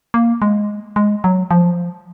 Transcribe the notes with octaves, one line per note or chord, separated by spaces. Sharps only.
A#3
G#3
G#3
F#3
F3